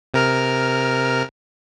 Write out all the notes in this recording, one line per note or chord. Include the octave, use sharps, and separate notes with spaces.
C3 A#4 F6